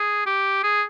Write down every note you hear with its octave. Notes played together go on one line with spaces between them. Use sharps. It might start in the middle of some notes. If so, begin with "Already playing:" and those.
Already playing: G#4
G4
G#4